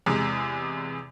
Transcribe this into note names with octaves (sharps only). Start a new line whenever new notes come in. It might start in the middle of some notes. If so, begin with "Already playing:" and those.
E2 C3 G#3